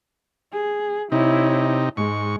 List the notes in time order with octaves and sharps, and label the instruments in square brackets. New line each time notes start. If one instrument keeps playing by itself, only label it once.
[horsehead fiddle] G#4
[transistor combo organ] C3 D#4 [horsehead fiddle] E4 C#5
[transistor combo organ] G#2 C#6 [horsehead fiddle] G#3